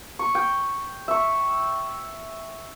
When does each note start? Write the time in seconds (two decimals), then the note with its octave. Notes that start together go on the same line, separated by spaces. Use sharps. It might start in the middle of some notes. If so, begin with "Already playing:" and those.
0.19 C#6
0.35 G5
1.08 E5 C#6